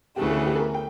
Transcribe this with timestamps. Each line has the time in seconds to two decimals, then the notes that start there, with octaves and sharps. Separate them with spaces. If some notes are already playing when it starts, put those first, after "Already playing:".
0.16 D2 C#3 E3 A3 G4
0.30 A4
0.46 G4
0.55 A4
0.59 A#4
0.74 G5